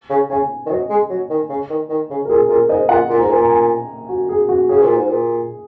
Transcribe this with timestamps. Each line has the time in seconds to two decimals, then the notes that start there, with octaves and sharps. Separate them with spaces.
0.10 C#3
0.30 C#3 G#5
0.66 D#3
0.70 F#3 D#5
0.90 G#3
1.09 F#3
1.30 D#3
1.49 C#3
1.70 D#3
1.89 D#3
2.10 C#3
2.25 A#4
2.29 A#2 G#4
2.49 A#2 A#4
2.69 G#2 D#5
2.89 A#2 F#5
3.09 A#2
3.19 G#2 A#5
3.29 A#2 G#5
3.38 A#5
3.49 G#5
4.09 F#4
4.29 G#4
4.49 F#4
4.69 C#3 G#4
4.82 A#2
4.95 G#2
5.08 A#2